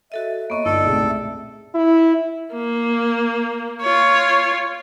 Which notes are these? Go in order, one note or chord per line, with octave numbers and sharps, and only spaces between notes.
F#4 A4 D#5 E5
A#3 B3 C#5 D#5 C#6
G1 D#4 A4 D5
C#2 A2 C3 G#4
E5
E4
A#3
F4 C#5